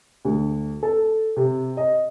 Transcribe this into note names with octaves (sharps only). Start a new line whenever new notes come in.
D2
A4
C3
D#5